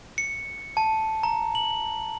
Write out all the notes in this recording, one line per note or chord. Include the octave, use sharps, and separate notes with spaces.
C#7
A5
A#5
F#7